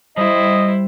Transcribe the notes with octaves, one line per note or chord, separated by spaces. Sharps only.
G3 E4 C5 D#5